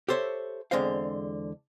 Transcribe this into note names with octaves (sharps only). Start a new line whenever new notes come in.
G4 A4 C5 C#5 E5
E2 D3 G#3 C4 C5 F5